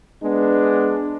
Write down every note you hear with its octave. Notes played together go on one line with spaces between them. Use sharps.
G#3 B3 D4